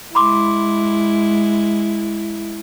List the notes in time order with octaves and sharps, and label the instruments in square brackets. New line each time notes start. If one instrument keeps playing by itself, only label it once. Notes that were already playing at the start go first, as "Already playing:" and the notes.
[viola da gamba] G#3 E4 [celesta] B5 C6 D6